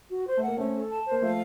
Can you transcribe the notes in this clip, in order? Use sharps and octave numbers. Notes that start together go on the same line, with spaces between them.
F#4
C5
A3 F#5
A#3
A3 C4 C#4
A4
A5
C5
A#3
F3 A3 F5